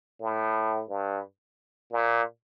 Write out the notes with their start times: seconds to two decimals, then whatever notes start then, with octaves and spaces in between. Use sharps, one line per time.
0.22 A2
0.90 G2
1.91 A#2